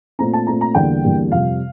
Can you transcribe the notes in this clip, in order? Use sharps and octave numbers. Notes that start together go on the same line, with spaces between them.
A#2 A3 C4 A#5
A5
A#2 A3 C4 A#5
A#5
E2 D3 G3 A#3 G5
E2 D3 G3 A#3
F2 C3 G3 F5